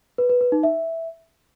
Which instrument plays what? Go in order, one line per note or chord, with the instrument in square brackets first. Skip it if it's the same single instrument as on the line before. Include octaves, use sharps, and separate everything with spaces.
[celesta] B4
B4
B4
D#4
E5